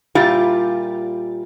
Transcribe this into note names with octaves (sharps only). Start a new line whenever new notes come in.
A#2 G3 E4 F4 G4